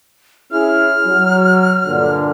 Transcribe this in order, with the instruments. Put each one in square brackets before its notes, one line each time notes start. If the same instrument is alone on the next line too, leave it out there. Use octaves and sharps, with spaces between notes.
[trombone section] C#4 E4 G#4 [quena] F6
[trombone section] F#3
G2 A#2 D3